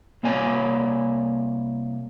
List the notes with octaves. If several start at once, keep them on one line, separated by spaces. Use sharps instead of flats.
C2 A#3 C#5 D5 G#5